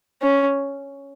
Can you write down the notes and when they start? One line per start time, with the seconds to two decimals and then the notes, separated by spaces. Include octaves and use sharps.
0.22 C#4